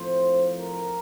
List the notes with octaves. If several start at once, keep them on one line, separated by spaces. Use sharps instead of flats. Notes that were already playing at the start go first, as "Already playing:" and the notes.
Already playing: A2 F3 C4 C5
A#4